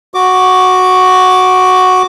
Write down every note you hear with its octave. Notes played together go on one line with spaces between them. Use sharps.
F#4 D6